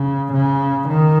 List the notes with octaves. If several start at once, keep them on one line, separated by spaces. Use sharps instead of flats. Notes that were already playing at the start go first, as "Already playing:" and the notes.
Already playing: C#3
C#3
D#3